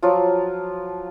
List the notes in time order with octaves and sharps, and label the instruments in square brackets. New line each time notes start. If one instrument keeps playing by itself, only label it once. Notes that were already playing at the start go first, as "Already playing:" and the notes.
[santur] F3 F#3 F4